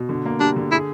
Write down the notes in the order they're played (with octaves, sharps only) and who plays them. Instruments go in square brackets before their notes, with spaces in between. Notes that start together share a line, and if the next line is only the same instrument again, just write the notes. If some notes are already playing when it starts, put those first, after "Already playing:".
Already playing: [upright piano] B2
D3
A#3
[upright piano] G3 [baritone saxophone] D4
[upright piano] D3
[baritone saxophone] E4 [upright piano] G#4